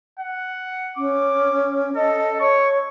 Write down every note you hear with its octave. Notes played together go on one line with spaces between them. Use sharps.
F#5
C#4 D6
A4 D#5
C#5 C#6